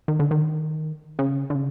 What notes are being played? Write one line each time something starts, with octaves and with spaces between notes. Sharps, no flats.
D#3
D3
D#3
C#3
D3
C#3